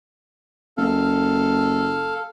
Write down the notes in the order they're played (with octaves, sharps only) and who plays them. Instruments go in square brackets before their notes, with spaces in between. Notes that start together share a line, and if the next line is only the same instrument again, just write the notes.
[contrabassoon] F#1 [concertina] A4 F5